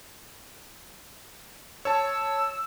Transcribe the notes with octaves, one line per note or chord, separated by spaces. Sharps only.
C#5 A5 E6